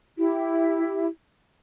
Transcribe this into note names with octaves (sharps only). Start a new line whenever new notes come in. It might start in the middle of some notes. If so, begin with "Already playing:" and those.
E4 G4